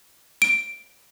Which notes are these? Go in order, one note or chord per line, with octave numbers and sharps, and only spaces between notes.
D7